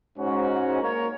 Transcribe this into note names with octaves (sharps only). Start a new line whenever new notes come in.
G#2 C#4 F#4
A#3 A#4 C#5